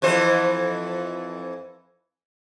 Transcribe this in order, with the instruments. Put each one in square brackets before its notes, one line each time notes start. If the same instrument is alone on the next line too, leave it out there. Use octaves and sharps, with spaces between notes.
[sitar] F2 E3 C5